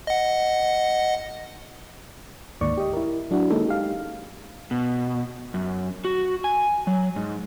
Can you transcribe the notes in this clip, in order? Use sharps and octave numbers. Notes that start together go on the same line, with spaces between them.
D#5 F#5
D2 G#2 D#3 A#3 D5 C#6
G4 D#5
E4 A#4
F#3 D4 E4 F#4
D#3 G#3 A#3 C#4 D#4 A4
D#4 G4 F5
B2
F#2
F#4
G#5
F#3
G#2